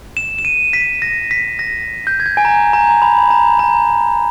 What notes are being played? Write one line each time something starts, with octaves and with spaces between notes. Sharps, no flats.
E7
E7
D#7
B6
A#6
B6
A#6
G6
G#6
G6
G#5
A#5
A#5
A#5
B5
A#5
A#5